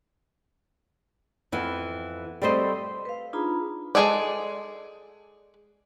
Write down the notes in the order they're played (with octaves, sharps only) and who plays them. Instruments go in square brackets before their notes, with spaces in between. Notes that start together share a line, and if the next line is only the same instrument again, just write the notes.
[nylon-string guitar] F2 E3 B3
G3 A3 C4 C5 D#5
[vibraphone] B4 F5
D4 D#4 F4 G#4 A#5 B5
[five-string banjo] G#3 B3 G#4 A4 D5